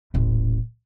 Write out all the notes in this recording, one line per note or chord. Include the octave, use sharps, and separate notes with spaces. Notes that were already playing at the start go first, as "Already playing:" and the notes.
D#1 A1